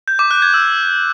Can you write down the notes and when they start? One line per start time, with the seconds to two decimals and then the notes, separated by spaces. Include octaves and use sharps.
0.08 G6
0.19 D6
0.31 F#6
0.42 G#6
0.54 E6